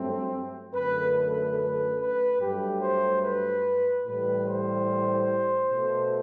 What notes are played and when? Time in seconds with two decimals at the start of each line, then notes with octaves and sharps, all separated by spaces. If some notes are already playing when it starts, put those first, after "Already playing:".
Already playing: G2 F#3 A3 C4
0.74 F#2 D3 A3 B4
1.17 B4
1.58 B4
2.00 B4
2.40 G2 F#3 A3 G4
2.81 C5
3.22 B4
4.06 A2 E3 G3 B4
4.47 C5
5.71 B2 A3